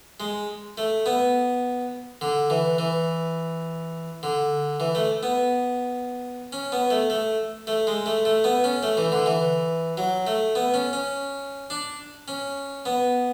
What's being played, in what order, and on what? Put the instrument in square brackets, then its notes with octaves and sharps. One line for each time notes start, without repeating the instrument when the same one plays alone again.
[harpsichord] G#3
A3
B3
D3
E3
E3
D3
E3
A3
B3
C#4
B3
A3
A3
A3
G#3
A3
A3
B3
C#4
A3
E3
D3
E3
F#3
A3
B3
C#4
C#4
D4
C#4
B3